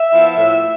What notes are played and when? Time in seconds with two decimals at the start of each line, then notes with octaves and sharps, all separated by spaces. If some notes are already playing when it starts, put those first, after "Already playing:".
Already playing: E5
0.13 F3 B3 E4
0.38 A2